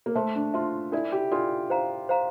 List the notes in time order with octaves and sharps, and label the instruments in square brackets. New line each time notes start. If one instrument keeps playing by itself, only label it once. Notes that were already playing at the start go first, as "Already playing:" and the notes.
[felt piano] A#3
[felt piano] A3 [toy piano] C5 E5 A5 C6
[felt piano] D4
[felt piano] F4 [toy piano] C5 E5 A5 C6
[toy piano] D4 A4 D5 [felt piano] E4
[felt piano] G4
[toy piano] D4 A4 D5 [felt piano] F4
[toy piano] C5 F5 A#5
C5 F5 A#5